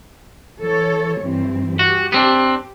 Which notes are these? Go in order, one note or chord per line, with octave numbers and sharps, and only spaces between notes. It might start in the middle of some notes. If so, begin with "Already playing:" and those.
E3 A4 C#5
G2 E3 C4
F#4 G4
B3 C4 D4